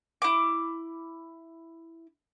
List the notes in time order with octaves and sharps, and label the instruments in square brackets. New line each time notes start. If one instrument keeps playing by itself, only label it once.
[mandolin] E4 D6